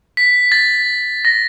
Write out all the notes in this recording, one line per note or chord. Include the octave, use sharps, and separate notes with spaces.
B6
A6
A#6